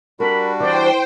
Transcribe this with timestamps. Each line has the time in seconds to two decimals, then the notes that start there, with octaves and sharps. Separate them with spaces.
0.20 G3 D4 F#4 A#4 B5
0.60 E3 C5 D5 G5